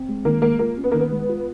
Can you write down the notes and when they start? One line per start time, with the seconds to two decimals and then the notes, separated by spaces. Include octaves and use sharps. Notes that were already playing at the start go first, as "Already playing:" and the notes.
Already playing: C4
0.08 G#3
0.25 D#3 A#3
0.42 G#3 A#3
0.59 A#3 F4
0.77 C#4
0.84 B3
0.92 D#3 A#3
0.99 B3
1.11 G#3
1.29 F4